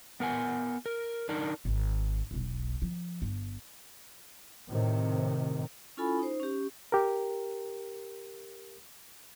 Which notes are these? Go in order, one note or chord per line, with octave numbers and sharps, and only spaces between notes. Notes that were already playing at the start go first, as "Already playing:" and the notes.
B3 A#4 F#5 G#5
A#4
D4 D#4 A#4
G#1
E1 B1
F3
G1
A2 C3 D#3
C#4 E4 F4 A4 G#5 B5
D#4 C5
C#4 G4
G4 A#4